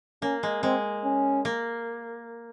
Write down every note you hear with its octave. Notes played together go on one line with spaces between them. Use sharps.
A#3 C#4
G#3
G#3 C4
C#4
A#3